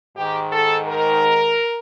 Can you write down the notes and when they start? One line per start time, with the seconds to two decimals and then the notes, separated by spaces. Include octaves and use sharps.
0.15 G#2 D#3 G4
0.51 A4
0.87 A#4